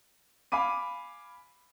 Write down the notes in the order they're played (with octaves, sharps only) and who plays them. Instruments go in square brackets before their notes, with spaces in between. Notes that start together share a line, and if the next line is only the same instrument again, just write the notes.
[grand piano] F5 G#5 B5 D6 D#7